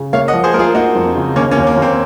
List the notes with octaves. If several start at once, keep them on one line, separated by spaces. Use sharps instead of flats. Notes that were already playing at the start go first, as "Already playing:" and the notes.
Already playing: C#3
A#3 C#5 F5
D#5 F#5
F3
G#4 C5
A#3 A#4
F4 G#4
A#3 D#4 F#4
F2
C#3
D#2 A#3 C#4
A#3 C#4
D#2
A#3
D#2
C4